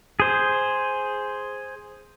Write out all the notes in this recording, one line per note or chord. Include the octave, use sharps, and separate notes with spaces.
G#4 C5